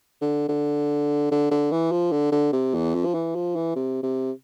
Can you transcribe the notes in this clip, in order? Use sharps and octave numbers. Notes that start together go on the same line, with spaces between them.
D3
D3
D3
D3
E3
F3
D3
D3
C3
E2
F2
F3
E3
F3
E3
C3
C3